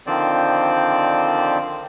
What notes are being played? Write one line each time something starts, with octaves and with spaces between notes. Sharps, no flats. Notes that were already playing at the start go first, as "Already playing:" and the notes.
D3 D#3 F3 C4 C5 D5